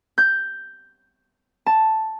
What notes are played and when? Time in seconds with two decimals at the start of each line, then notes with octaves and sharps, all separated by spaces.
0.18 G6
1.66 A5